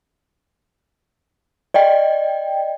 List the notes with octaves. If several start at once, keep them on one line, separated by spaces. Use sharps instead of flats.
D5 D#5 G5